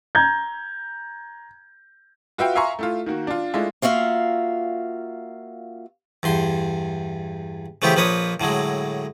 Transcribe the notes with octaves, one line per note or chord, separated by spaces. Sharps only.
A#5 G6 G#6
F4 F#4 B4 E5 F5 G5
E5 F5 G#5 A#5 C6 C#6
A3 E4 F4
D#3 A#3 F#4
D4 F4
G#3 A3 D4 E4 F4
A#3 F4 F#4 E5 F5
E2 G2 C6
C#3 E3 A3 B3 C4 G4
A#1 F3 A#3 B4 C#5 D#6
A2 D3 F#3 G#3